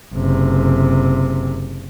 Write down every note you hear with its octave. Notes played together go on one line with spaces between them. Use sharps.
F#1 C3